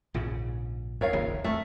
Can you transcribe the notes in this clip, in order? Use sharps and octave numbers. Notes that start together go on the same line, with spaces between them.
A#1 G#2 C#3
F2 D#3 C#5 F5
D#1 A#1 C#3
F2 A3